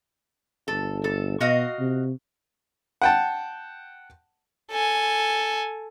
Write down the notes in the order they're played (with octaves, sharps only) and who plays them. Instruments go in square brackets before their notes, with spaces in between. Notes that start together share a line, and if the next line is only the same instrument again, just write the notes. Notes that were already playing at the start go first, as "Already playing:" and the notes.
[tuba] G1 [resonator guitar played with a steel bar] A4
[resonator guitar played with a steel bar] A4
[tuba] B2 [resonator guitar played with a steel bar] F#4 D#5 F5
[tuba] C3
[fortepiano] F#5 G5 A5
[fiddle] A4 G#5